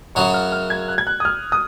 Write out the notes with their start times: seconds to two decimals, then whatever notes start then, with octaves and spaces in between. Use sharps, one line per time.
0.15 F#2 C#3 F#3 C#6
0.34 F6
0.52 F6
0.70 G#6
0.88 F#6
0.98 G#6
1.07 F#6
1.20 D#6
1.25 F6
1.52 D#6